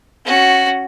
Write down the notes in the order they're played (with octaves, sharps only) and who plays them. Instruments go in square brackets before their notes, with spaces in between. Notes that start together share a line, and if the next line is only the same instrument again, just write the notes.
[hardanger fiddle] C#4 F#4